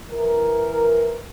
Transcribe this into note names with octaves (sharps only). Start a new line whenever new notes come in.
E3 A#4